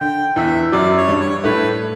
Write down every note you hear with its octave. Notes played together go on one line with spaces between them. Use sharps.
D3 G5
E2 E3 E5
F#2 F#3 D5
C#5
G2 G3
C#5
A2 A3 B4